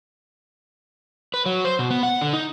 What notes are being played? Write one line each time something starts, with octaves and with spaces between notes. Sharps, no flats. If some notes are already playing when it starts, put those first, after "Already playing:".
B4
F#3
C5
B2
B3
F#5
D3
D#4